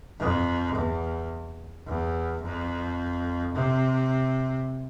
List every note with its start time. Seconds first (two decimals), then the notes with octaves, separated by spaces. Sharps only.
0.19 F2
0.75 E2
1.87 E2
2.43 F2
3.54 C3